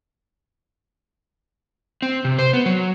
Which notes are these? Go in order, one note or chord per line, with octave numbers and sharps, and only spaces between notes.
C4
C3
C5
B3
F#3